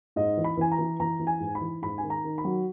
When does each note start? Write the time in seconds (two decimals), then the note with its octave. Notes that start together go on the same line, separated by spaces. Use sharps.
0.16 G#2 D#5
0.37 E3
0.44 B5
0.57 E3 G#5
0.72 A#5
0.79 E3
1.00 E3 A#5
1.20 E3
1.27 G#5
1.40 G#2
1.55 B5
1.61 E3
1.82 G#2 B5
1.98 G#5
2.03 D#3
2.10 A#5
2.24 D#3
2.38 B5
2.45 F#3